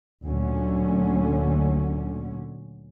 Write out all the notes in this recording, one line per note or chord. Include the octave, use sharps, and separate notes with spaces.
D2 A#2 D3 F#3 C#4